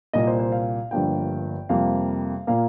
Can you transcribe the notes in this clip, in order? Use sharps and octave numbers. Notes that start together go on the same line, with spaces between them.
C2 A#2 A#3 D#5
C5
C5
F5
G1 G2 F3 A#3 G5
F2 C3 G3 A#3 F5
A#2 A#3 F5